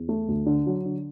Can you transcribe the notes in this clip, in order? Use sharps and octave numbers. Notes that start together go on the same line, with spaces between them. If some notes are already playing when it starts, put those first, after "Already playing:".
Already playing: E2
A3
D2
D3
F#3
D3